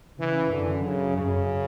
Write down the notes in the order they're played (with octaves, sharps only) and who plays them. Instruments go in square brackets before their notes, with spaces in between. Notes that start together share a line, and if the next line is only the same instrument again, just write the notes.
[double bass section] C#3 [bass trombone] E3
[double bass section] F#2 [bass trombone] D3
[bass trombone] C#3
[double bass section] F#2 [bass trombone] C#3